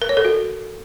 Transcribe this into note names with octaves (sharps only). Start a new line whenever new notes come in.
A#4
C#5
A4
F#4